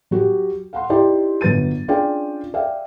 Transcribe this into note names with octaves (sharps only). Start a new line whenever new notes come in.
F#3 F#4 G4
F5 F#5 C6
D#4 E4 G4 D5 G5 C6
G1 F#3 B4 A6 D#7
C#4 D4 F4 G#4 D5 G5
D5 E5 F5 G5